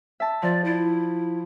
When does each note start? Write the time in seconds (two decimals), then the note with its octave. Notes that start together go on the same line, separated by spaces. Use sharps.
0.20 E5 A5
0.42 F3 D5
0.64 E4